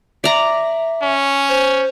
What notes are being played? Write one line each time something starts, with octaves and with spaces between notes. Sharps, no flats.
D5 E5 A#5
C#4
C5